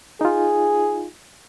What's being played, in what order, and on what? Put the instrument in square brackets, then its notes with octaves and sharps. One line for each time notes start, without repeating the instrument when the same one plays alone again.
[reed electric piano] D#4 F4 [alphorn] G#4